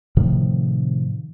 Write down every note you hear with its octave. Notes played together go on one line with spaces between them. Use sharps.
A2 C3 D#3 F3